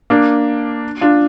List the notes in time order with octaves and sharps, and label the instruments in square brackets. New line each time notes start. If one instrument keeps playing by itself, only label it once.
[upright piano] A#3 D4
D4 F4